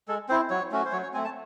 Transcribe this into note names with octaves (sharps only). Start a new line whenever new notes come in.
G#3 A4
C4 E4 C5
F#3 C#5
A3 C#4 F#4
C5
F#3 C#5
C#5
A3 C4 G#5
A5